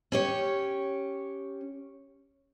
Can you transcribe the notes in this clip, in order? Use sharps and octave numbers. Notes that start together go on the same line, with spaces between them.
C#4 G4 C#5